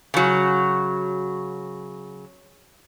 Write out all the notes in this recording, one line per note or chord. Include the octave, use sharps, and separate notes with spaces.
C#3 F#3